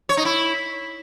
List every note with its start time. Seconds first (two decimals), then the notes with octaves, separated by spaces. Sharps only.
0.09 C#5
0.17 D#4
0.25 E4